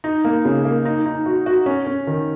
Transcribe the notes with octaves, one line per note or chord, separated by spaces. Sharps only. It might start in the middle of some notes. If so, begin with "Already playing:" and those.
D#4
A#3
C#3
A#3
D#4
D#4
F#4
F#4
C#4
C#4
D#3